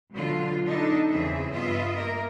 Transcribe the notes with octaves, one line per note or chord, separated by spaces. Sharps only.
B2 D3 F#3 F4
B3 D4 D#4 A4
E2 C#3 E3 C4 G#4 E5
G2 B3 F4 D#5 E5
A#3 A#4